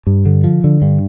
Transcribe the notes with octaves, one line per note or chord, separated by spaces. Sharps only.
G2
D3
F3
D3
G2